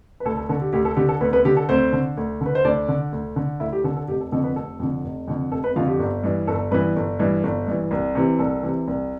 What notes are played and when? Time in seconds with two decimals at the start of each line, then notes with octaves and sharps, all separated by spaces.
0.20 B4
0.25 D2 A4
0.37 A4
0.49 D3 A4
0.61 G4
0.73 D2 G4
0.85 A4
0.97 D3 G4
1.09 A4
1.21 D2 B3 B4
1.33 B3 B4
1.45 D3 G4
1.57 A4
1.69 D2 C4 C5
1.93 D3
2.17 D2
2.41 D3 B4
2.55 C5
2.64 D2 D4 D5
2.88 D3
3.12 D2
3.36 D3
3.60 D2 E4 E5
3.73 G4
3.84 D3 A4
3.96 A4
4.08 F1 G4
4.21 A4
4.32 F2 D3 A4
4.44 B3 B4
4.56 F1 A4
4.80 F2 D3
5.04 F1
5.28 F2 D3
5.52 F1 A4
5.64 B3 B4
5.76 F2 D3 F4 F5
5.88 G4
5.99 G1
6.24 G2 E3
6.47 G1 A4
6.71 G2 E3 B3 B4
6.96 G1
7.19 G2 E3
7.43 G1
7.67 G2 E3
7.91 C2
8.15 C3 E3
8.39 C2 A4
8.63 C3 E3
8.88 C2